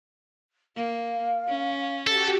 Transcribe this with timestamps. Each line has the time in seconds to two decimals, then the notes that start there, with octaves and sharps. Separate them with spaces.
0.76 A#3 F5
1.48 C#4
2.07 F#4 G4 A4